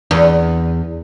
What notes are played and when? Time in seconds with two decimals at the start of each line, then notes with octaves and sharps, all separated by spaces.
0.11 E2